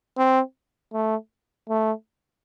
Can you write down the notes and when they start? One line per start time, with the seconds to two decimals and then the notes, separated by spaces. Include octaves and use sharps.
0.18 C4
0.93 A3
1.69 A3